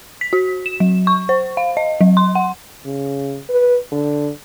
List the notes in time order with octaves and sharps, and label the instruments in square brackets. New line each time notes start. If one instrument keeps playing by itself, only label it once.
[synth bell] B6
F#4
E7
F#3
C#6
C5
F5
D#5
F#3
C6
F#5
[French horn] C#3
B4
D3